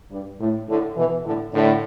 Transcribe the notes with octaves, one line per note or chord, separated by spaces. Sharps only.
G2
A2
A2 D3
B2 E3
A2 D3
A2 D3